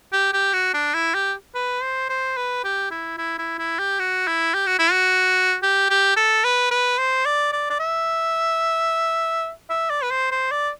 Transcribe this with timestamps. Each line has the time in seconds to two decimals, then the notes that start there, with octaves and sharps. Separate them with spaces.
0.12 G4
0.33 G4
0.53 F#4
0.74 D4
0.94 E4
1.14 G4
1.55 B4
1.82 C5
2.09 C5
2.37 B4
2.64 G4
2.91 E4
3.18 E4
3.38 E4
3.59 E4
3.79 G4
3.99 F#4
4.27 E4
4.54 G4
4.66 F#4
4.79 E4
4.92 F#4
5.63 G4
5.90 G4
6.16 A4
6.44 B4
6.71 B4
6.98 C5
7.25 D5
7.52 D5
7.70 D5
7.79 E5
9.70 E5
9.90 D5
10.03 B4
10.11 C5
10.31 C5
10.51 D5